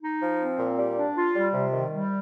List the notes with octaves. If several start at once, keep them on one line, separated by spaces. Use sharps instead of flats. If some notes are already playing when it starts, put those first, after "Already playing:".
D#4
F3
C4
A#2
G3
D4
F4
G3
C3
D#3
G3